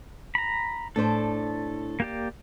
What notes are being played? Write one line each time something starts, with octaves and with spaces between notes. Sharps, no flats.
A#5 B5
A2 D4 A4 C5
A#3 G4 D5